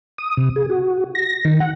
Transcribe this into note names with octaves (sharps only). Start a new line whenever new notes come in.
D#6
C3
G#4
F#4
A#6
D#3
F#5